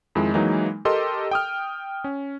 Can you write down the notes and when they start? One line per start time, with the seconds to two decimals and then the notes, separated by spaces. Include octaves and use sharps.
0.15 F2 D#3 G#3 E4
0.34 E3 F#3 G#3 A#3 D#4
0.85 G4 A4 A#4 D#5 C6
1.31 G5 D#6 F6
2.04 C#4